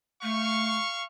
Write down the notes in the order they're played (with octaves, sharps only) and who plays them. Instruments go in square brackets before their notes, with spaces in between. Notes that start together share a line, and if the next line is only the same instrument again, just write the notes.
[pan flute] A3 [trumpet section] F5 C#6